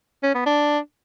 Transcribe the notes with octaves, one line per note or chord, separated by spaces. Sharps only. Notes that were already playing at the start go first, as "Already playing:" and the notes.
C#4
B3
D4